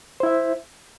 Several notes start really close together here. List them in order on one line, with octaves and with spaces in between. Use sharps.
C5 E4 E5